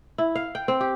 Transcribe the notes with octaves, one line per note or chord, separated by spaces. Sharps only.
E4
F5
G5
C4
G4